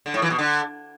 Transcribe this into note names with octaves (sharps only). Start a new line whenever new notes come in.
D3
A2
E3
B2
D3